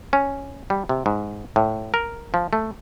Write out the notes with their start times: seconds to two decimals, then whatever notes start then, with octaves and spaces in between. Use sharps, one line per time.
0.13 C#4
0.70 G3
0.89 C3
1.06 G#2
1.56 A2
1.94 A#4
2.34 F3
2.53 A3